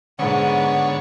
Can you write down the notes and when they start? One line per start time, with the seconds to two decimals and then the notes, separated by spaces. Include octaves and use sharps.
0.19 G#2 D3 B3 C#5